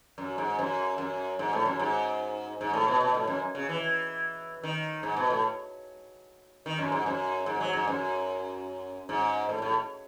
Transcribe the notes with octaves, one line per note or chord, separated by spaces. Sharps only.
F#2
G#2
F#2
F#2
G#2
A2
F#2
G#2
G#2
A2
B2
B2
A2
F#2
C#3
E3
D#3
G#2
B2
A2
D#3
F#2
G#2
F#2
G#2
F#3
G#2
F#2
G#2
A2
A2